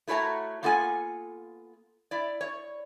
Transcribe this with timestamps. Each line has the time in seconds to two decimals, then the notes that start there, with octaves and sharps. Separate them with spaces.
0.08 A3 E4 F#4 C#5 A5 A#5
0.63 A#3 B3 F4 A4 F#5 G#5
2.11 E4 D5
2.41 C#5